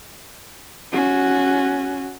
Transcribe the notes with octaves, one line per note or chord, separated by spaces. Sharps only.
C#4 F#4